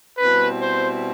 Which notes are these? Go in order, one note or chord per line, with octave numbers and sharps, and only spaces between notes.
B2 G3 C4 E4 B4
C5